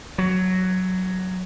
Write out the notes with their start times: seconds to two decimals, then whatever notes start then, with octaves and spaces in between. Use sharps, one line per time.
0.18 F#3